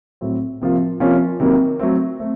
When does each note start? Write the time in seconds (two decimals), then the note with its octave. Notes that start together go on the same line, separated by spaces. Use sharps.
0.21 A2 F#3 C4
0.61 C3 F3 A#3 F4
1.00 C3 F3 A#3 C#4 F4
1.40 C3 D#3 F#3 A#3
1.79 F#3 A3 C4
2.20 A3 C4